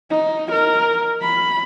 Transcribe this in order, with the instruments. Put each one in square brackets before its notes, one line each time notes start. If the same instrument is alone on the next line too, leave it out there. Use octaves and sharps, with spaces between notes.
[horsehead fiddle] D#4
A#4
B5